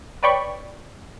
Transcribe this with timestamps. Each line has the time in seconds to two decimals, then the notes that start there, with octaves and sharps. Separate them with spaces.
0.23 B4 C#5 D5 G5 B5 C#6